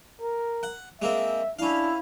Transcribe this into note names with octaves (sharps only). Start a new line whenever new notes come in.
A#4
F#5
G#3 A#3 C4 E5
C#4 D4 E4 F5